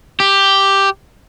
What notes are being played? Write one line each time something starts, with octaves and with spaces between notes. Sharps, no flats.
G4